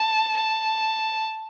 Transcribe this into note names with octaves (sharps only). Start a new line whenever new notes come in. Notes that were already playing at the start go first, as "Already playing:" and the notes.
Already playing: A5
A5